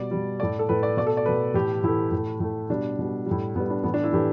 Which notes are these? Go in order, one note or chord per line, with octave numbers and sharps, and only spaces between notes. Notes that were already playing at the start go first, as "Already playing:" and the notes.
Already playing: B2 G3 D5
B2 G3
A2 A3 D5
A4
A2 A3 B4
D5
B2 A3 D5
A4
D5
B2 A3 B4
A2 E3 A3 G4
A2 E3 A3 E4
A2 A3
A2 A3
B2 G3 D4
B2 G3
A2 G3
A2 G3 B3
D4
A2 E3 A3 B3
D4
E4
A2 E3 A3 G4